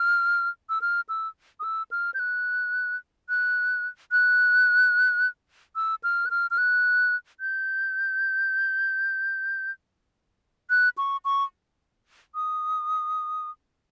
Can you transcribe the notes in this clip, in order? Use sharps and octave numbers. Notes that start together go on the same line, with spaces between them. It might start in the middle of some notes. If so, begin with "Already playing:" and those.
Already playing: F6
E6
F6
E6
D#6
E6
F6
G6
F#6
F#6
F#6
E6
F6
F#6
F6
F6
F#6
G6
F#6
C#6
C#6
D#6